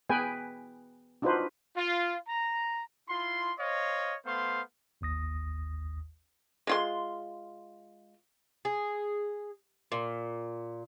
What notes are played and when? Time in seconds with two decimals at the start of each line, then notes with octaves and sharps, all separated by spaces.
0.09 B3 G#4 B4 G5 G#5
1.22 D4 D#4 F4 F#4 B4 C5
1.75 F4
2.28 A#5
3.09 E4 F4 C6
3.59 C5 C#5 D#5 F5
4.25 A3 B3 C5 F5 C6
5.01 G#1 D#2 D#6 A#6
6.67 G#3 F4 C6
8.65 G#4
9.92 A#2